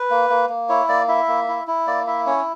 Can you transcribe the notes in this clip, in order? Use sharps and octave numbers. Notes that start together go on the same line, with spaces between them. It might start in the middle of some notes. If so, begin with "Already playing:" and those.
Already playing: B4
A#3
A#3
A#3
E4 C#5
A#3 D5
E4 E5
A#3
E4
E4
A#3 D5
E4 E5
C#4 C#5